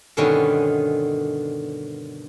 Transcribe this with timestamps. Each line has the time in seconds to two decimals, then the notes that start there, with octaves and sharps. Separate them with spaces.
0.17 G2 B2 D3 D#3 B3 C#4